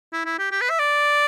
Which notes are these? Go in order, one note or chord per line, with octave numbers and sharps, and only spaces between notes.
E4
E4
G4
G4
B4
E5
D5